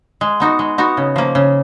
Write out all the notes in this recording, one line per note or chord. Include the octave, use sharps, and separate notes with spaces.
G#3
B3 D#4 F#4
G#3
B3 D#4 F#4
C#3
F3 A#3
C#3